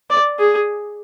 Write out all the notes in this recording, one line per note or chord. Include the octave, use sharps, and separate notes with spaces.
D5
G#4